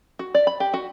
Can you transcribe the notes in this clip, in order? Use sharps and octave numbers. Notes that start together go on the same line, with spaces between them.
F#4
D5
B5
G4
F#4